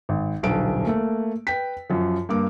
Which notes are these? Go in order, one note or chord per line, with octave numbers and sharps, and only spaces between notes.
G#1
D#1 B1 D3 D7
A3 A#3
B4 G5 B6
F#2 F3
G2 A#3 D6